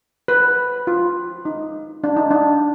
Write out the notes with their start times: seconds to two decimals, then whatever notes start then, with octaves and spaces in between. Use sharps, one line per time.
0.28 B4
0.87 F4
1.45 D#4
2.04 D4
2.17 D#4
2.31 D4